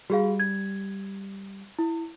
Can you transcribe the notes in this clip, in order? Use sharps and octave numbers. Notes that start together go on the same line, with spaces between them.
G3 F#4 G#4 F5
G#6
E4